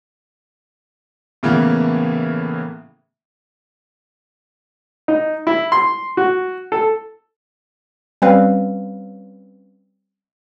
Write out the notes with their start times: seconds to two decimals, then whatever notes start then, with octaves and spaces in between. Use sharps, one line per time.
1.43 A2 C#3 E3 A#3 B3
5.08 D#4
5.47 E4
5.72 C6
6.17 F#4
6.72 A4
8.22 G3 C4 C#4 B4 F5